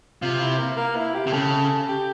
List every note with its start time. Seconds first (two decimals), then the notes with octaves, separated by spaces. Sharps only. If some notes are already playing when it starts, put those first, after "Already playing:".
0.22 C3 F4
0.39 E4
0.58 A#3
0.77 A#3
0.96 E4
1.14 G4
1.27 C3
1.32 C#3 A4
1.88 G4